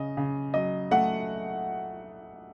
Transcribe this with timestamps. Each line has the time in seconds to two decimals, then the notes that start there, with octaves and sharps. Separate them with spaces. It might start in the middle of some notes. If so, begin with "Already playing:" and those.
Already playing: C#3 D#5
0.17 C#3
0.54 F#3 D#5
0.91 A3 F#5